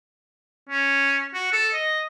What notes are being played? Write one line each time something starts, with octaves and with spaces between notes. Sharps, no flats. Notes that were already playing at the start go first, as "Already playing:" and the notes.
C#4
F#4
A4
D#5